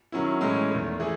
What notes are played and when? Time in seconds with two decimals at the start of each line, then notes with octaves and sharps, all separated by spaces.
0.12 D#3 F#3 C#4 E4
0.41 A2 E3 G#3 C#4
0.71 E2 D#3 A3
1.00 E3 A3 E4 G#4